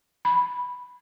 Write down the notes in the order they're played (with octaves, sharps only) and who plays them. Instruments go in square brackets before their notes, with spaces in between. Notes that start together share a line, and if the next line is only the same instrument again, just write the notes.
[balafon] B5